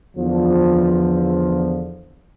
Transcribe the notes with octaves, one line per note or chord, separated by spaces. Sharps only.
E2 D3 F3